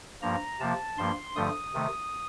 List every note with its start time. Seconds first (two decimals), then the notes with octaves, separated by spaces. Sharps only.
0.22 G2 F3 A#3 A#5
0.60 C3 F3 A#3 A5
0.98 G2 F3 A#3 C6
1.36 G2 D3 F3 A3 D#6
1.74 C3 D#3 A3